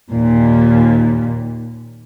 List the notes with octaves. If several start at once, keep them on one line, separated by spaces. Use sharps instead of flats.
D#2 A#2